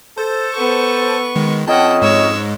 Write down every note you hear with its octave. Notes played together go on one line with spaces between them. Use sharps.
A4 C5
B3 C#6
D#3 G#3
F2 C#4 D#5 F#5 G5 A5
G#2 G#3 C#5 E6